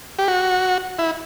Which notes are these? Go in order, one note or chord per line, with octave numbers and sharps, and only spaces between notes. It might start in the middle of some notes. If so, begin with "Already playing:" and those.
G4
F#4
E4